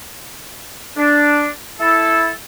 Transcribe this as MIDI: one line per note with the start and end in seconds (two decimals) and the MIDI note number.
0.97 1.48 62
1.80 2.29 64
1.80 2.29 69